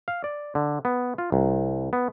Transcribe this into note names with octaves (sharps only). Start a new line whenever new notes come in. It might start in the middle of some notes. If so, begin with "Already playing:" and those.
F5
D5
D3
B3
F4
C2
B3